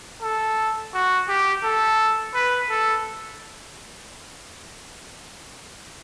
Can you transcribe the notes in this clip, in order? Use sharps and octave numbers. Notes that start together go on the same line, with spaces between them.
A4
F#4
G4
A4
B4
A4